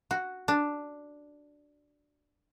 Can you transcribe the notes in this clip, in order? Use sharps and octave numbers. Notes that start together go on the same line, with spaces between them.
F#4
D4